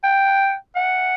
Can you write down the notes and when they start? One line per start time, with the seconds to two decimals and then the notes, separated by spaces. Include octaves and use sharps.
0.04 G5
0.76 F#5